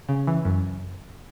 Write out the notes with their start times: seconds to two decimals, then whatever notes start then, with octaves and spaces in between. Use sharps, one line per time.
0.09 C#3
0.27 E3
0.45 F#2